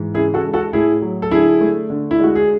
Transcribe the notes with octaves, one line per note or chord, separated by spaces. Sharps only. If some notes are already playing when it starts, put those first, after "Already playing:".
Already playing: G#2 E3
C#3 E4 G#4
F#4 A4
G#3
F#4 A4
A2 E4 G#4
F#3
A4
D3 E4 G#4
A3
D3
E4
G#3 F#4
G#4